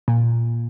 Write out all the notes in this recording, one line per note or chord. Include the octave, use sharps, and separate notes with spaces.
A#2